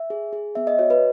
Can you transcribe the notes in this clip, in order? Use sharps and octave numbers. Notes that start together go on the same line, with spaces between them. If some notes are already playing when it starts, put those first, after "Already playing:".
Already playing: E5
G#4
G#4
B3 E5
D#5
F#4 C#5
B4